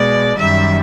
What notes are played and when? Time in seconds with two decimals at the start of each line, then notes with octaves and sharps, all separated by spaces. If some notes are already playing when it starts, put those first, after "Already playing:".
Already playing: B2 G#3 D5
0.38 F#2 D#3 G3 E5